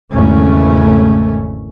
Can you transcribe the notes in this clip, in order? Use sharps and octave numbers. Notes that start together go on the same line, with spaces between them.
G#1 E2 C#3 A3 C#4